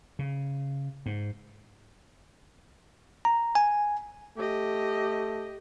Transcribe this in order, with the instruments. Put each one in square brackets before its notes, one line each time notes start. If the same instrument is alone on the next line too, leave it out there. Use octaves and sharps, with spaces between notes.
[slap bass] C#3
G#2
[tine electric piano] A#5
G#5
[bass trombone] A3 [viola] G4 D#5